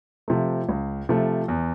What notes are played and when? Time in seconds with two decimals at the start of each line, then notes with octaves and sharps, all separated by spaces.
0.28 C3 F3 A3
0.69 C#2
1.09 C3 F3 A3
1.48 E2